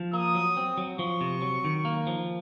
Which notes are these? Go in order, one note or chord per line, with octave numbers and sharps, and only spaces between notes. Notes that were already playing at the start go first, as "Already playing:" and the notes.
Already playing: F3
A#3 D#6
F#3
C4
F#3
F3 C#6
C3
F#3
D#3
A#3
F3